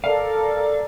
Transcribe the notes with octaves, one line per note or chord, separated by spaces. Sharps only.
A4 A#4 D5 F5